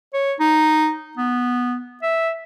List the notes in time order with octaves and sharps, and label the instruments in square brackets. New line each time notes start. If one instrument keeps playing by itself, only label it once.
[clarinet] C#5
D#4
B3
E5